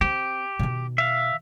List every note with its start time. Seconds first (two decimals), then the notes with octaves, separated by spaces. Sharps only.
0.01 C4 G4
0.59 B2 D#3
0.98 E5 F5